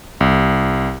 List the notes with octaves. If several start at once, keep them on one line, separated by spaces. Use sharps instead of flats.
C2